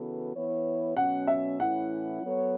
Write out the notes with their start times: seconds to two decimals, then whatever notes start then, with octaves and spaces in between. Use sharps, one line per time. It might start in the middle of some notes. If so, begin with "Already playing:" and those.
Already playing: C#3 E3 B3 F#4 A4
0.34 E3 B3 E4 C#5
0.96 B2 F#3 C#4 F#5
1.27 E5
1.59 A2 E3 C#4 E4 F#5
2.22 F#3 B3 A4 C#5